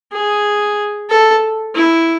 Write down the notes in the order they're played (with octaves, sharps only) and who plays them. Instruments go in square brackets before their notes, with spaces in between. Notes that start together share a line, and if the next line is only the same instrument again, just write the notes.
[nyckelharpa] G#4
A4
E4